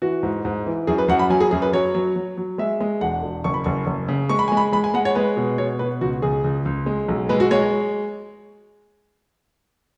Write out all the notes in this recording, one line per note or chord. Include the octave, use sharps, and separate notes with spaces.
E3 F#4
G#2
G#2
E3
F#2 G#4
B4
F#2 F#5
B5
F#3 G#5
G#4
F#2 G#4
B4
F#3 C#5
F#3
F#3
F#3
G#3 E5
G#3
E1 F#5
E1
F#1 C#6
B5
F#1 C#6
F#1
C#3
G#3 C#6
B5
G#5
G#3
B5
G#3 B5
G#5
G#3 F#5
C#5
G#3 B4
B2
B2 C#5
B2 B4
C#2 F#4
C#2 G#4
C#2
C#2
G#3
B1
G#3 B4
F#4
G#3 C#5